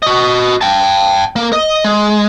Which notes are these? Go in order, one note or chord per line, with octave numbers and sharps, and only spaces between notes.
F#4 D#5
G5 A5
A#3
D#5
G#3